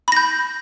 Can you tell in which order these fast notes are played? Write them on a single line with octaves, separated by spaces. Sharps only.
B5 A#6 G6